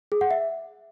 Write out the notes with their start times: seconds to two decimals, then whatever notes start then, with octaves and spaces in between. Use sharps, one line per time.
0.12 G#4
0.21 F#5
0.31 E5